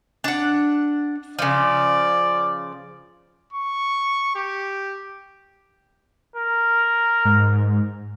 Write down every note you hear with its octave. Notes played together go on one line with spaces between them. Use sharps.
D4 F#5
C#3 F3 D5
C#6
G4
A#4
G#2